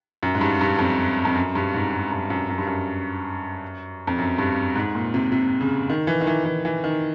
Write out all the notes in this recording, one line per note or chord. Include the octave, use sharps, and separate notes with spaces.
F#2
G#2
G2
G2
F2
F2
F#2
G2
G#2
G#2
G2
F#2
F#2
G2
F#2
F2
F#2
G2
G#2
A#2
C3
C3
C#3
D#3
E3
D#3
E3
E3
E3
D#3